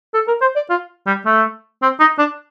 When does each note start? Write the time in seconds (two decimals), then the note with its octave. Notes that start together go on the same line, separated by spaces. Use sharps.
0.14 A4
0.27 A#4
0.41 C5
0.56 D5
0.70 F4
1.07 G3
1.26 A3
1.82 C4
2.00 D#4
2.19 D4